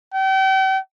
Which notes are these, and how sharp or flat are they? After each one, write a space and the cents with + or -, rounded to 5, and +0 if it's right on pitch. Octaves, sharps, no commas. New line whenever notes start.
G5 -40